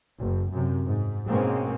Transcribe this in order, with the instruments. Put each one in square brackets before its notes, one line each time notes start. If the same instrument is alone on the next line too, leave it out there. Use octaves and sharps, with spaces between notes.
[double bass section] F#1
F#2 C3
G#2
G#2 B2 G#3 A#3 C4 C#4